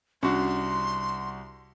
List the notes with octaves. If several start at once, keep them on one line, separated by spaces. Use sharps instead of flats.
C2 C#4 D4 F#4 F#5 C6